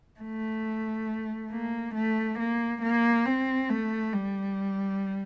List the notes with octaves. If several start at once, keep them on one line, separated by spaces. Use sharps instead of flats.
A3
A#3
A3
A#3
A#3
C4
A3
G3